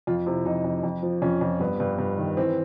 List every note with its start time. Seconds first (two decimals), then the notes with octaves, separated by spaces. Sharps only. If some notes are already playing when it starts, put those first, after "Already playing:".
0.07 F2 F4
0.26 C3 E4
0.45 F2 D#4
0.64 F2
0.83 F2
1.02 F3
1.22 F2 C#4
1.41 F2
1.60 G2 B3
1.80 G2
1.99 G2
2.18 D#3
2.37 E3 C4